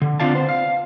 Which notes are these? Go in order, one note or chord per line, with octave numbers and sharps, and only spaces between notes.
D3
C4 D4 F4 D5 F5 A5
B3 C5
F5